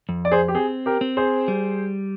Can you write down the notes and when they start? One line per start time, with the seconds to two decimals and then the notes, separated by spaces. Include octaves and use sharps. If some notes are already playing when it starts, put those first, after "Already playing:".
0.09 F2
0.25 D5
0.32 G#4 C5
0.48 G4
0.55 C4 G#4
0.86 G4 A#4
1.01 C4
1.17 G#4 C5
1.48 G3